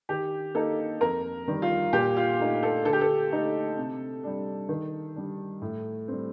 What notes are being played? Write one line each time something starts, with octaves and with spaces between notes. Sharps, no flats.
D#3 G4
A#3 D#4 A4
F2 A#4
D#3 G3
F4
A#2 G4
F4
A3 D#4
A4
D3 A4
G4
A4
A3 D#4
C3
G3 D4
D#3
G3 D4
A2
G3 C4